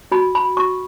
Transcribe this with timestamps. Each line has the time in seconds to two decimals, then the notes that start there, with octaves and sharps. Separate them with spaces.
0.12 F#4 B5
0.35 B5
0.57 F#4 C#6